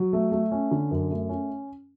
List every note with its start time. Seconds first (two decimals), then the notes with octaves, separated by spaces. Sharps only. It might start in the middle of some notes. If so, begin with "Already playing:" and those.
Already playing: F#3
0.13 A3
0.32 A3
0.51 C#4
0.71 D3
0.91 F#2
1.10 A3
1.29 C#4